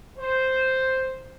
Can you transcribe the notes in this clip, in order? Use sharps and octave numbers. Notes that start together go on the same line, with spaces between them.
C5